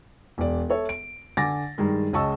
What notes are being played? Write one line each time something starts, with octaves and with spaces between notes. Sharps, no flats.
E1 D5
A4 C#5 E5
D7
D3 G#5 D6 A6 A#6
G2 D#3 G#3
C#2 C#3 D#5 A5 C#6 E6